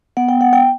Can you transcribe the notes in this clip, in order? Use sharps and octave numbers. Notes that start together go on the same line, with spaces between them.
B3 F#5
G5
B3 F#5
G5